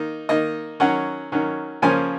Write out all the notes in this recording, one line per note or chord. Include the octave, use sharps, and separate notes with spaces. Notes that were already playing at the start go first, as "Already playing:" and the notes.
Already playing: D#3 A#3 D#4
D#3 A#3 D#4 D#5
D#3 F#3 C#4 F#5
D#3 F#3 C#4
C#3 F3 A#3 C#4 G#5